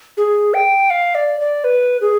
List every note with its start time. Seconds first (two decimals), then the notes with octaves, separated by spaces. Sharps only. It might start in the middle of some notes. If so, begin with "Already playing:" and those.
0.17 G#4
0.54 G5
0.90 F5
1.15 D5
1.40 D5
1.64 B4
2.01 G#4